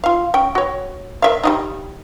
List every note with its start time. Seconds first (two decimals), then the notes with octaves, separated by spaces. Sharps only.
0.04 F4 F5
0.34 C#4 G5
0.55 F#4 C#5
1.22 A#4 E5 F5
1.43 G3 D4 D#4